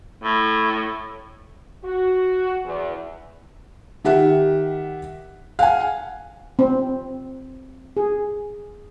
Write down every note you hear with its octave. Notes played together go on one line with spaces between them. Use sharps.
A2
F#4
E2
D#3 G4 E5 F#5
F5 F#5 G#5
C4
G#4